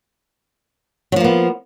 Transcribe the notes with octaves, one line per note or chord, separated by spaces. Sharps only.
F3 F#3 A#3 B3